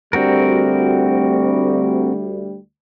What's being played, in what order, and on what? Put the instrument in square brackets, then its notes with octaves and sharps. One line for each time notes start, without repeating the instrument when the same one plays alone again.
[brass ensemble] D2 G3 [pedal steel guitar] C4 F#4 A#4